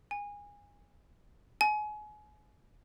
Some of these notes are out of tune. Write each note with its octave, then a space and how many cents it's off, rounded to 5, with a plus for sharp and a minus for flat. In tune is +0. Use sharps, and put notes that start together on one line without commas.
G#5 -25
G#5 +30